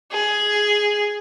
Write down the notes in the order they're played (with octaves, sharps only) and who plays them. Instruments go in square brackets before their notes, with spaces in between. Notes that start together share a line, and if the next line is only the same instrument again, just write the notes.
[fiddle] G#4